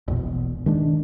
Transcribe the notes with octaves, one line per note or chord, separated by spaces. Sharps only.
E1 A#1 B2
D#3 G#3 D4